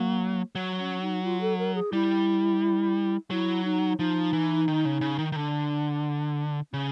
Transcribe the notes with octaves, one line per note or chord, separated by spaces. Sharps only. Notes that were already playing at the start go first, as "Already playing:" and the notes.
Already playing: F#3 A#3
F#3
C#4
D#4
F4
A4
A#4
G#4
G3 E4
F#3 E4
D#4
F3 D#4
E3
D#3
C#3
C#3
D#3
D#3
D3 D4
C#3 C#4